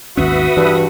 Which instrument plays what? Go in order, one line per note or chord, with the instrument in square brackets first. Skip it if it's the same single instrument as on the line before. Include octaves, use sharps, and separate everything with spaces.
[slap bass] G#1 D#2 C#4 [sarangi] F#4 [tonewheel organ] B4 E5 D#6
[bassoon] G2 [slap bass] E3